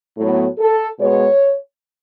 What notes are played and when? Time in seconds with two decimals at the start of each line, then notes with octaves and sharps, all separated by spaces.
0.18 A2 F#3 B3
0.58 A4
0.98 B2 G#3 B3 C#5